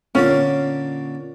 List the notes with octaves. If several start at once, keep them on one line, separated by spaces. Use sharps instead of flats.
A#2 D3 A#3 C#4